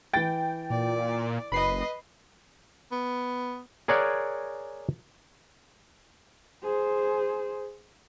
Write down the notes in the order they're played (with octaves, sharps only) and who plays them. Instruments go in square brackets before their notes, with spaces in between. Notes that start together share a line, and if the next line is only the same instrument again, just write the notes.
[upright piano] E3 A6 [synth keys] G5
[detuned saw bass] A#2 [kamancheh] D5
[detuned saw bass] F#1 [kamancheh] B4 D#5 [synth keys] B5 C7
[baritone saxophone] B3
[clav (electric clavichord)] G#4 A#4 C#5 D5 F#5 G#5
[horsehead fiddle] G#4 C5